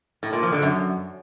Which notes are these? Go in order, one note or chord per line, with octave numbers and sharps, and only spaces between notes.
A2
A#2
F3
D3
F#2